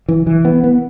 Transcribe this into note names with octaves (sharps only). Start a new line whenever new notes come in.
E3
E3
B3
B3